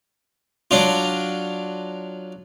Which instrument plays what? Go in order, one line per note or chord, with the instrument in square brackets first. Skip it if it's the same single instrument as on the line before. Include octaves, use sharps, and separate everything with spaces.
[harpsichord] F#3 D4 F4